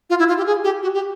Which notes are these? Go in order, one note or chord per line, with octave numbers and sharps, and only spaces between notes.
F4
E4
F4
G4
G#4
G4
F#4
G4